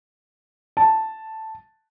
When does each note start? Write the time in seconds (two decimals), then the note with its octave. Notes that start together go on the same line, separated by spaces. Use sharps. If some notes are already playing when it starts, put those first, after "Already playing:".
0.77 A5